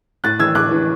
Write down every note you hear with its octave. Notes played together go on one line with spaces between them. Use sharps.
A2 F#6 A6
E3 E6 G#6
A2 D6 F#6
E3